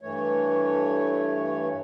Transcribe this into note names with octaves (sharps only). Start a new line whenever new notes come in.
G2 E3 A3 C#5